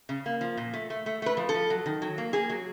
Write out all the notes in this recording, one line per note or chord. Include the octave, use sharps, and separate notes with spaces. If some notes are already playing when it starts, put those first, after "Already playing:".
C#3
A#3
F3
A#2
A3
A3
A3
A3 B4
F3
A4
F3
F#3
D#3
F#3
A#3
A#3 G#4
F#3